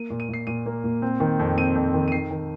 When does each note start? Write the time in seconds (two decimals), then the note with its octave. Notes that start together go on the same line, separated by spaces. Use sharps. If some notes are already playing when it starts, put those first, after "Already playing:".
Already playing: A#3 D#7
0.10 A#2
0.20 D#7
0.29 A#2 C7
0.47 A#2 D#7
0.66 A#3
0.84 A#2
1.02 C4
1.20 D#3
1.39 F2
1.57 C4 D#7
1.75 F2
1.94 D#3
2.08 D#7
2.12 D#3 C7
2.31 D#3